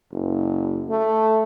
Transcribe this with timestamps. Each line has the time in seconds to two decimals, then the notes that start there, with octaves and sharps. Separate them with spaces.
0.12 F#1
0.89 A3